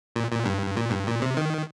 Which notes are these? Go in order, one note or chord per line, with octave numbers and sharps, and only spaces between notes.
A#2
A#2
G2
A#2
G2
A#2
C3
D#3